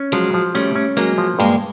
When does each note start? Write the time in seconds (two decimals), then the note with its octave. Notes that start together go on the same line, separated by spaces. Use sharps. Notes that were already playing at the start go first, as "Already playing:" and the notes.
Already playing: C#4
0.12 F3 F#3 G#3
0.34 F3
0.55 G3 A3 C#4
0.75 C#4
0.97 F#3 G#3 A#3
1.18 F3
1.39 G2 G#3 A#3